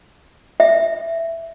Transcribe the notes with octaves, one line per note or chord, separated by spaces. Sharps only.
E5